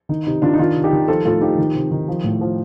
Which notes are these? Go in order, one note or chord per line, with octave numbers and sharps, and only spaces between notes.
D#3 D#4
C3 D#4
D#3 D4 F4
D#4
D#3 D4 F4
C3
D#4 G4
D#3
F3 F4 A4
A2 F4 A4
F3 D#4 G4
D#3
C3
D#3
F3
A2
F3